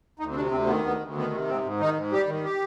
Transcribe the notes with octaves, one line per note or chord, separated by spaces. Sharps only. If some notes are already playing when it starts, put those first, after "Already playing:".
D2 D#4
C4
C3 D4
D2 C4
D#3 B3
D2 B3
D2
D#3 B3
C3
G#2 C4
G#2
D#3 D#4
G#2
G3 G4
D#3
G4